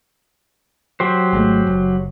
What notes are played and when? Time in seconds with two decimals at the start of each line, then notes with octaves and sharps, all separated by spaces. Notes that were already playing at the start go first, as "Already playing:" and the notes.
1.00 F#3 G4 C5
1.33 G#1 G#3 A3
1.67 F#1